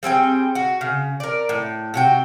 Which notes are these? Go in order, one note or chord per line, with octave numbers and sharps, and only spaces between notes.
G3 C4 G#4 G5
F#4
C#3
A#4 D5
A2
C3 F#4 G5